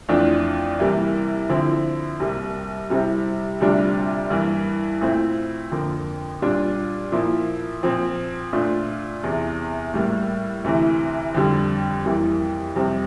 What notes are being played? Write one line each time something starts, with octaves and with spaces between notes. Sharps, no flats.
F2 E3 A3 D4 F4
C3 E3 G3 A#3 E4
D3 F3 C4 E4
C2 C3 G3 A#3
C3 G3 C4 E4
D2 C3 G3 D4 F4
G2 E3 A#3 E4
A#2 A3 C4 E4
F2 D3 F3 A#3
A#2 G3 D4 F4
A#2 F3 A#3 E4
A#2 F3 C4
A#2 A3 D4 F4
E2 C3 E3
A2 G3 A#3
D2 C3 E3
F2 D3 G3
F2 E3 G3 A#3 E4
F2 C3 G3 C4